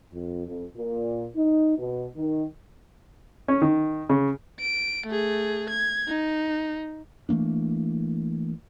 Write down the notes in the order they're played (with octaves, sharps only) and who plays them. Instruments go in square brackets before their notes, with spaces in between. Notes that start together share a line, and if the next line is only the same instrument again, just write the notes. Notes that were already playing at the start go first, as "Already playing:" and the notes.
[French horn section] F2
F2
A#2
D#4
B2
D#3
[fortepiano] C#4
D#3
C#3
[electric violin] D7
A3 G#4
G#6
D#4
[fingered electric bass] E3 A3 A#3 D4